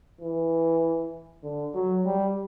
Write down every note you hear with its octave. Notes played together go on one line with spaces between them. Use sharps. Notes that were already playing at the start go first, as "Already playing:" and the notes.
E3
D3
F#3
G3